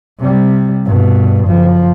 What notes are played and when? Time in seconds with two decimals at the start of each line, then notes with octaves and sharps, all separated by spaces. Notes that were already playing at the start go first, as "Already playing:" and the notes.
0.19 C3 G3
0.85 G2 B2
1.47 F#1 F3